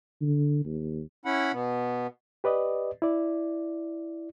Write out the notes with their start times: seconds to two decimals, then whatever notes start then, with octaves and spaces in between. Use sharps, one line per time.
0.21 D3
0.65 D#2
1.25 C#4 E4 F#5 B5
1.53 B2 B3
2.44 G4 B4 D5 D#5
3.02 E4 D5